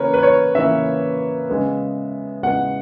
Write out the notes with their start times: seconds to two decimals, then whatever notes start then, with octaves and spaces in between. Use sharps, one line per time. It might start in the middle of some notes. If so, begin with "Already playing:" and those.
Already playing: C#3 E3 A#3 A#4 B4 C#5
0.14 B4
0.23 C#5
0.55 C#3 E3 A#3 E5
1.49 C#3 G#3 B3
2.43 C#3 G#3 B3 F#5